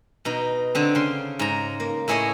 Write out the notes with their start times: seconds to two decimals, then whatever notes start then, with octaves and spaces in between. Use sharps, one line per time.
0.25 B2 D#4
0.75 D3 C4
0.95 C#3 C6
1.39 G#2 A#5
1.80 A#3
2.08 A2 E4 G#4 C#5 D#5